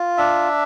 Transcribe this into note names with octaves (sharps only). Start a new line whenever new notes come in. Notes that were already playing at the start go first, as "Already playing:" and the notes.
Already playing: F4
D4 E5